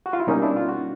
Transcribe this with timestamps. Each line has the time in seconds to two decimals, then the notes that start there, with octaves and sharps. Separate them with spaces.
0.06 F#4
0.13 F4
0.20 E4
0.27 B2 G3 A#3 C#4 D#4
0.42 D4 E4
0.56 F4
0.69 F#4